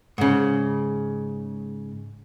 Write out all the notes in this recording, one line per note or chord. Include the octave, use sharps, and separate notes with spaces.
G#2 C#3